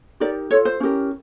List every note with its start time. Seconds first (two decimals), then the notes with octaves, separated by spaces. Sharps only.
0.20 D#4 G4 A#4 D5
0.51 F4 A4 C#5
0.65 C5
0.80 C#4 E4 G4 A#4